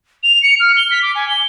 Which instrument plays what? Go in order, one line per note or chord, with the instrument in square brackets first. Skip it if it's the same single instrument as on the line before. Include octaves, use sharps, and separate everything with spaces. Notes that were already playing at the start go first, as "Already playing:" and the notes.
[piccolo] F7
C#7
F6
G7
B6
D6
G#5
G7